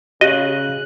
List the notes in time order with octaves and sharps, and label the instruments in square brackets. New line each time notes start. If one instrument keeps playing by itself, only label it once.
[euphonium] C#3 [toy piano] F#4 G4 F5 [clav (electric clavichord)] D#5 [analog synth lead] F#6